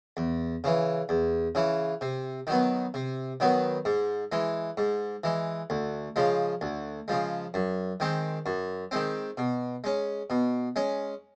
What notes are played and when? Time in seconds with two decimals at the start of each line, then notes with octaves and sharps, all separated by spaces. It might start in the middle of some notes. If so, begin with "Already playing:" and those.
0.17 E2
0.64 C#3 E3
1.09 E2
1.55 C#3 E3
2.01 C3
2.47 D#3 F#3 B3
2.94 C3
3.40 D#3 F#3 B3
3.85 G#2
4.32 E3 G#3
4.77 G#2
5.24 E3 G#3
5.70 D2
6.16 C#3 F3 G#3
6.61 D2
7.08 C#3 F3 G#3
7.54 F#2
8.00 D#3 G#3 C4
8.46 F#2
8.91 D#3 G#3 C4
9.37 B2
9.84 G#3 C#4
10.30 B2
10.76 G#3 C#4